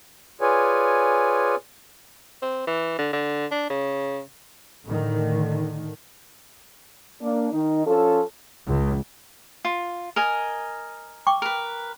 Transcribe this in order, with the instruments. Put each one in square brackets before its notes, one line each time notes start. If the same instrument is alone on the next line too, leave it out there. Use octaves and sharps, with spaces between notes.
[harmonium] F4 G#4 B4 C#5 D5 G#5
[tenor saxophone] C4
E3
D3
D3
D4
C#3
[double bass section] A2 D3 D#3
[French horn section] A#3 D4
D#3 D#4
F3 C#4 F4 A4
[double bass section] C#2
[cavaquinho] F4
A#4 D#5 G#5
[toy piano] G5 C#6 D6
[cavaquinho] A#4 B4